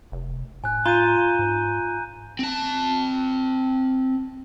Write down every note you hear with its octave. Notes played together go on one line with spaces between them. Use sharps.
F1
A2 G#5 F#6
F4 A#5 G6 D#7
G#2
C4 A5